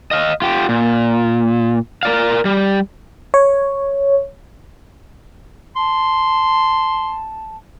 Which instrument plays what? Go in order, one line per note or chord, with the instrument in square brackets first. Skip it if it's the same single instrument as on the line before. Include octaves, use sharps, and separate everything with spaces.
[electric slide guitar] D#5 F5
F4 G4
A#2
A#4 D5 F5
G3
[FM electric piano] C#5
[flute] A5 [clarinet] C6